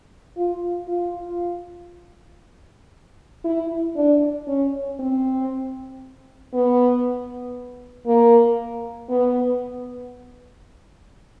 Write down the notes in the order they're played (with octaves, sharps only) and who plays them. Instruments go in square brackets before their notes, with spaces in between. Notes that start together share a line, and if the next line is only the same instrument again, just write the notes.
[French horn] F4
F4
E4
D4
C#4
C4
B3
A#3
B3